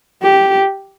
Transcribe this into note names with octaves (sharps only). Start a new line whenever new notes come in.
G4